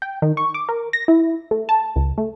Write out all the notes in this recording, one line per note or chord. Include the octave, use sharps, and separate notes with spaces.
G5
D#3
C#6
D6
A#4
A#6
E4
A3
A5
C#2
A3